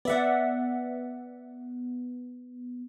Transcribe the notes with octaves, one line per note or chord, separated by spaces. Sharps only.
B3 D5 E5 F#5